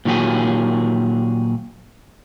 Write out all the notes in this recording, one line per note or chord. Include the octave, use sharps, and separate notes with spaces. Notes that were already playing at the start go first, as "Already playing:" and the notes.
A#2 D#3 F#3 G4 G#4